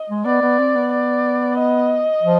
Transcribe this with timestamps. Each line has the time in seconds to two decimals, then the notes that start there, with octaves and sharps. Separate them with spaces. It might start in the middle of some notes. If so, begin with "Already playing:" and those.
Already playing: D#5
0.09 G#3
0.25 B3 D5
0.42 B3
0.59 C4
0.75 B3
0.92 D5
1.58 D#5
2.23 F3